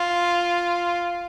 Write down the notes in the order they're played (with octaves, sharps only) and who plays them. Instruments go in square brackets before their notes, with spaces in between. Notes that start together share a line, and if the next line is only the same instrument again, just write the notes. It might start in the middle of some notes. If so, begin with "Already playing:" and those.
Already playing: [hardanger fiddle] F4